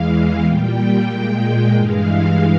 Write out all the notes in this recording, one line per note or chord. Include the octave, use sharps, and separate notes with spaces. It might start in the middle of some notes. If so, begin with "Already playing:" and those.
Already playing: E2 E3 G#3 F5
A#2 G3 G5
A#2 G#3
G2 E3 G#3 F5